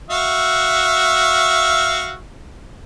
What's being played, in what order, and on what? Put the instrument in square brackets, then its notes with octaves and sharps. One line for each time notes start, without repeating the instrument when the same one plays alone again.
[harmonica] F#4 E5 F5